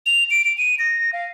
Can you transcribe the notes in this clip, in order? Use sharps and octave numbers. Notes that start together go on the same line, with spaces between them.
F7
D7
D7
D#7
A#6
F5